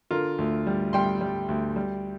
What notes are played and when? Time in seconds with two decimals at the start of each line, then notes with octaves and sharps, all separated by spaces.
0.11 D3 F4 A#4
0.38 D2
0.67 G3
0.93 G3 G5 C6
1.21 G3
1.48 D2
1.76 G3